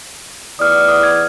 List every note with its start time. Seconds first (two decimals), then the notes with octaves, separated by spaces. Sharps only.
0.59 E2 B3 D5 D#6 F6
0.88 D#6
1.03 G#6